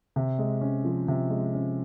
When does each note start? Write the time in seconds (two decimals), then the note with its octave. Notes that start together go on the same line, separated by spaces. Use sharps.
0.16 C3
0.39 G#3
0.61 C#4
0.85 F3
1.08 C3
1.30 G#3
1.54 C#4